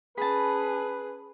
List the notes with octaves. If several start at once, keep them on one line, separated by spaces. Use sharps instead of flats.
C#4 G#4 B4 A5 B5